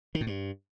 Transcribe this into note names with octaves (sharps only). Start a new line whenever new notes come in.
D#3
A2
G2